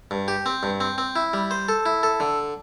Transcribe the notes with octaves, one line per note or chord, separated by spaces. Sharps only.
G2
G4
C4
G2
C4
C4
E4
G3
C5
A4
E4
A4
D3